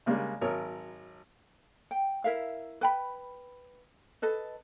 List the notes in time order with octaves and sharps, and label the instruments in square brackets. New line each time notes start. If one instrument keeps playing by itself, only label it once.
[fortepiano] C#3 G3 G#3 A#3 D4
G#1 F#3 A#4 C#5 D#6
[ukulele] G5
E4 A#4 E5 F5
B4 G5 B5
A4 B4 D#5